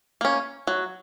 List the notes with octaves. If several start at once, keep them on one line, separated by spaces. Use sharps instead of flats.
A#3 C#4
F#3